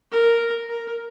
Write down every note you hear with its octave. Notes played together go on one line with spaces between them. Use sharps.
A#4
A#4